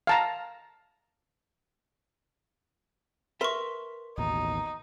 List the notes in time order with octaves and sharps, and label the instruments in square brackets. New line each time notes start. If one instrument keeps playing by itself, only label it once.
[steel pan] F5 A5 A#5
[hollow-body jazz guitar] A#4 B4 E5 [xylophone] C6 C#6
[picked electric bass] A1 D#2 B2 [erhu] D#4